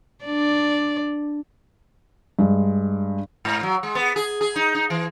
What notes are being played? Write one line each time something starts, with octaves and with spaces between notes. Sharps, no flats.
D4 D5
G2 G#3
G#2
F#3
G#3
B3
G#4
G#4
D#4
D#4
E3